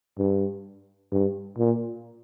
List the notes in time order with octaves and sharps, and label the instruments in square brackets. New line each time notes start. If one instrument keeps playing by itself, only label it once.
[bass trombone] G2
G2
A#2